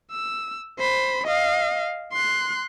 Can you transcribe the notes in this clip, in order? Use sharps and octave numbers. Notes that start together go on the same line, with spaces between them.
E6
C5 B5
D#5 F5
C6 F#6